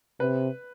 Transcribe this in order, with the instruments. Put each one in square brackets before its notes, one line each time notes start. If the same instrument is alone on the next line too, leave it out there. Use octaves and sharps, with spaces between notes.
[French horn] C3 [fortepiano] B4